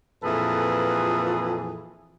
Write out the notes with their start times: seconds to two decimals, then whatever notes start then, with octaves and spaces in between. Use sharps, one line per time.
0.23 F2 A#2 E3 G#4 A4 B4